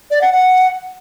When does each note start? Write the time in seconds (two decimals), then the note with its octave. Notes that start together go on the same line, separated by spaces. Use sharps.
0.11 D5
0.21 F#5
0.32 F#5